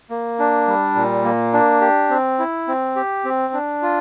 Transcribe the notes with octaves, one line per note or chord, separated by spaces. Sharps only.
A#3
D4
G3
A#2
A#3
D4
G4
C4
E4
C4
G4
C4
D4
F4